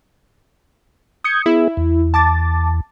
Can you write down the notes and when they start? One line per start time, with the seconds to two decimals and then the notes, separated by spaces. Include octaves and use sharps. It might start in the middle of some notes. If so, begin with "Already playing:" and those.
1.24 D#6 G6 G#6 C#7
1.46 B3 E4 G#4 E5
1.77 E2
2.14 A5 D6 A6